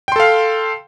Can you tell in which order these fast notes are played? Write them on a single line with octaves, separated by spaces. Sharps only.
G5 C6 A4 F5